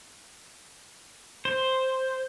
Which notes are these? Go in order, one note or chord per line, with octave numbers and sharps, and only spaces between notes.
C5